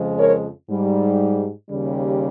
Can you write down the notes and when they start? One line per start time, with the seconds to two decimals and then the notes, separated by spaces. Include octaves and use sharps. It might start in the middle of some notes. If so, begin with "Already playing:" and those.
Already playing: F2 C#3 F3 G#3
0.18 A#4 C#5
0.70 G#2 G3
1.69 D#2 C#3 G3